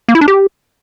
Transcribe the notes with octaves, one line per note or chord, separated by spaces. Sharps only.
A#3
E4
D4
G4